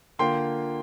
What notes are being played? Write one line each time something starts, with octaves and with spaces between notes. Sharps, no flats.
D3 A#3 F4 G5 C6